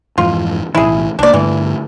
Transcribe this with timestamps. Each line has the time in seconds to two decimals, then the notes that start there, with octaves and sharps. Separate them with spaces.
0.18 F2 G#2 E3 F4
0.75 B1 A2 E3 E4 G#4
1.19 C2 A#3 D4 D5
1.33 G2 D3 E3 A3